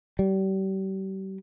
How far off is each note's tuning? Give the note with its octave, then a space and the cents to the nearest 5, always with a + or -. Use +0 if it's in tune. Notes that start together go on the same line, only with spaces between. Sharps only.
G3 -35